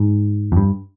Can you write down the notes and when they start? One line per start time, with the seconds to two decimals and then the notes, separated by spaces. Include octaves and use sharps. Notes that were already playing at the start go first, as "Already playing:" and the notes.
Already playing: G#2
0.52 F2
0.56 G2